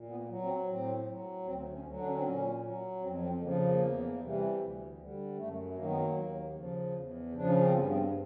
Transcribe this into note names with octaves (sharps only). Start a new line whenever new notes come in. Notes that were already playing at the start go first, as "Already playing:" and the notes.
Already playing: A#2
B3
A#3
F#3
C4
A2 C4
F#3
D2 C4
C#4
D3 F#3
D4
C#4
C4
A#2 C#4
F#3
F2 C4
C4
C#3 F3 A#3
A#3
E2
C3 E3 G3
D2
D3 G3
F#2 A3
D#3 F#3 A#3
B3
A#3
D#2
C#3 F3
E2
C#3 F3 D4
C#4
C4
G2 B3
B3
C4